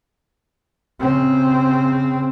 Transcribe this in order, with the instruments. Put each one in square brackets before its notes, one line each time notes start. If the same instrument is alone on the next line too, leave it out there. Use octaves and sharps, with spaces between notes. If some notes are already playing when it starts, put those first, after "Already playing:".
[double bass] C#3 C4